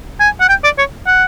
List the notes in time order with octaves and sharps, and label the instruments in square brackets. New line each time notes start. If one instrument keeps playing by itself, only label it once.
[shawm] G#5
F#5
G5
D5
C#5
F#5